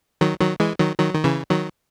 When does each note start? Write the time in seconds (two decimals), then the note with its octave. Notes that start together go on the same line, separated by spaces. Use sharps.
0.21 D#3 F#3
0.40 D#3 F#3
0.60 E3 G#3
0.79 D#3 F#3
0.98 D#3 F#3
1.14 D#3
1.24 C#3 E3
1.50 D#3 F#3